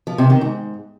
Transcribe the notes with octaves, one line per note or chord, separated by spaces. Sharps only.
F3
C3
D#3
G#2